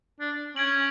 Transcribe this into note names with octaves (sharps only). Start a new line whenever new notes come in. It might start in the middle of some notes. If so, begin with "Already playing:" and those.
D4
C#4 G#6 D7 F#7